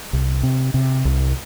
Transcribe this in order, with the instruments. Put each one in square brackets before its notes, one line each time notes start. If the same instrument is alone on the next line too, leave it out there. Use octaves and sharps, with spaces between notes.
[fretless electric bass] C2
C3
C3
C2